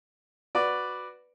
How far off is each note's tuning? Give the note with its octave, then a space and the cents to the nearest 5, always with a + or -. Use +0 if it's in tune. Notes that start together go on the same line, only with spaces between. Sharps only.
F#4 +0 B4 +0 D5 +0